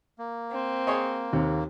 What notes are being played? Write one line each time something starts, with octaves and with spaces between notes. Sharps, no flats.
A#3
C4
G#4 C#5 D#5
D#2 C3